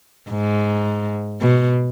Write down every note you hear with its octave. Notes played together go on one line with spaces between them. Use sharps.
G#2
B2